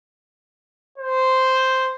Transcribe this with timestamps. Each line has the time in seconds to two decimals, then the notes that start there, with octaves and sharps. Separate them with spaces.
0.98 C5